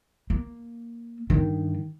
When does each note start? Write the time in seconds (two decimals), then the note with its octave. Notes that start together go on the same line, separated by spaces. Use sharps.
0.30 A#3
1.30 G2 D#3